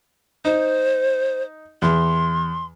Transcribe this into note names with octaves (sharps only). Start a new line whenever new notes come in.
D#4 C5
E2 C6